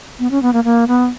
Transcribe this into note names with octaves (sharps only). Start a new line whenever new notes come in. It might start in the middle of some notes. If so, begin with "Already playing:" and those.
B3
C#4
B3
A#3
A#3
B3